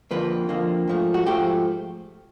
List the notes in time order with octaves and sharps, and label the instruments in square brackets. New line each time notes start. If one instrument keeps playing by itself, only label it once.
[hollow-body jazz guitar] F2 D3 F3 A#3 B4
F2 D3 F3 A#3
G#2 F3 A3
F#4
G#2 F3 A3 G4